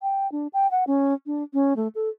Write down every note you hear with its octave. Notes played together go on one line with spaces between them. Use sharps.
G5
D4
G5
F#5
C#4
D4
C#4
A3
A4